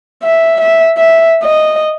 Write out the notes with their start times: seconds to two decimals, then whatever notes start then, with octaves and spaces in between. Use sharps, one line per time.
0.23 E5
0.61 E5
0.98 E5
1.44 D#5